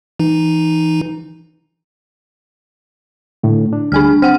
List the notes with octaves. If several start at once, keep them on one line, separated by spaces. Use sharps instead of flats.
E3 D#4
A2 D3
D4
D2 G3 D4 G#5 F6
C4 F#5 F6